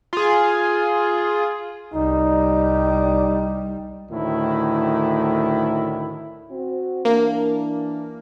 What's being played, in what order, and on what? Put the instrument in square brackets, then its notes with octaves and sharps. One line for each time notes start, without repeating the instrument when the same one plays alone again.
[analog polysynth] F4 G#4
[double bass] C2 G3 [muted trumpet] D#4
[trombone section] D2 A2 D#3 E4
[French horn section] C4 F#4
[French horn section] E3 D4 [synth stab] A#3